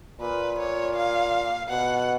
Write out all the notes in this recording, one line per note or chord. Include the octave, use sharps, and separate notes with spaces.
A#2 B4
C#5
F5
B2 F#5